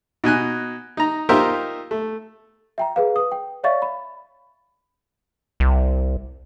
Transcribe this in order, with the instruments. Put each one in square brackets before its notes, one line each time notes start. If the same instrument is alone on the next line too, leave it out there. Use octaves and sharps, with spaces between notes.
[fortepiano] B2 D#4 G#5 F#6
D#4 A#5
D#4 F4 G4 A#4 C5 E5
A3
[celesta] E5 G5 A#5
G#4 B4 F5
B4 D#6
G5
C#5 D5 E5 F5 C#6 A6
B5
[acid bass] C2